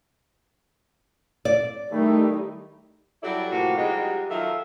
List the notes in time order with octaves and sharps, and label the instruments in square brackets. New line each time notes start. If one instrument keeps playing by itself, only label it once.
[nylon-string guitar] D5
[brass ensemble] D#3 E4 G4 [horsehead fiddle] G3 D#4 [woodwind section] A3
[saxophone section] F#3 G3 E4 A4 D5
A2 C3 F3 A#3 F#4
F3 G3 G#3 D#4 F#4 G4
D#3 F#3 F4 A4 E5 F5